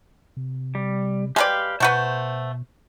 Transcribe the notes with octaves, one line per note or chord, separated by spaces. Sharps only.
C3
G3
G#3 G4 B4 D5 F5 G5
B2 A3 F#4 B4 C5 G6